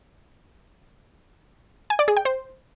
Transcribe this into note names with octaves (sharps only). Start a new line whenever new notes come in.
G#5
D5
G#4
G5
C5